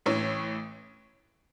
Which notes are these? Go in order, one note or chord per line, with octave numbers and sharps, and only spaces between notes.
A1 A2 E3 C#5